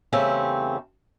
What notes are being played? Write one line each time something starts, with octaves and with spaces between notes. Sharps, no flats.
E2 C#3 A3 C4 G4